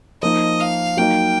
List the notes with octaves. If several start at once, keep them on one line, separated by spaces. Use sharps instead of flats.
F3 A#3 D#4 D#5
F5
F#3 A#3 D#4 G5